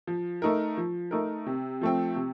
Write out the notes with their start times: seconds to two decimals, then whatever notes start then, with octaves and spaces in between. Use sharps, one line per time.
0.07 F3
0.42 A3 D#4 A#4
0.77 F3
1.11 A3 D#4 A#4
1.46 C3
1.82 F3 A3 C4
2.16 C3